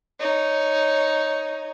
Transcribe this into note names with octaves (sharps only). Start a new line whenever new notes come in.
D#4 C#5